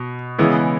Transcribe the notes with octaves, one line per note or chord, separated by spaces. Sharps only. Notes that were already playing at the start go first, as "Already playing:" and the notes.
Already playing: B2
C#3 E3 G#3 B3 E4